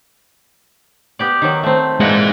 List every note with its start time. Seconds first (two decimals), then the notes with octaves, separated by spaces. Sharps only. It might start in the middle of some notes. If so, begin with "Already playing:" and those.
1.19 B3 G4 D5
1.42 D#3 F#3
1.63 A3 C4
2.00 A#2 E3 G#3 D#4 F#5